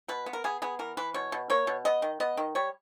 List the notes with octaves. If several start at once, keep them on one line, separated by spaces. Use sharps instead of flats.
B2 B4
B3
A#4
B3 G#4
B3 G#4
E3 A#4
E3 B4
B2 C#5
B2
A#3 C#5
B2
B3 D#5
D#3
B3 D#5
D#3
G3 C#5